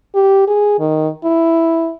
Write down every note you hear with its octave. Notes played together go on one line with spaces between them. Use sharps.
G4
G#4
D#3
E4